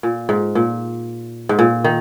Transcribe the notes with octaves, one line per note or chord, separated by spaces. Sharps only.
A#2
G#2
A#2
G#2
A#2
D#3